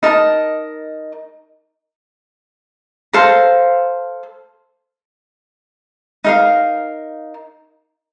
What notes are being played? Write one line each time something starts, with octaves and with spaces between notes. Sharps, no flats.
D#4 A#4 D#5 A5
A4 C5 F5 A#5
D#4 A#4 F5